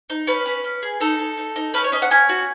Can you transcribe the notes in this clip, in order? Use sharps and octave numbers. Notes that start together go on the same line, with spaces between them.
D#4
C#4 B4
C#4
C#4
G#4
D#4 A4
D#4
D#4
D#4
C#4 B4
C#5
C#4 D#5
F#5
C#4 G#5
F#4